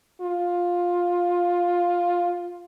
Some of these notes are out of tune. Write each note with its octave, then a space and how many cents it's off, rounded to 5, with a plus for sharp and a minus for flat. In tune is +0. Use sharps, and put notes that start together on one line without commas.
F4 +10